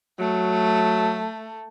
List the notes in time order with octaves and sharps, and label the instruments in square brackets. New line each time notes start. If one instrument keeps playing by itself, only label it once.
[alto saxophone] F#3 [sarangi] A3